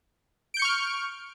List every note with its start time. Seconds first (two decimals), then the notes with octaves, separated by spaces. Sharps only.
0.54 D7
0.57 G6
0.59 C#7
0.62 C#6
0.65 F6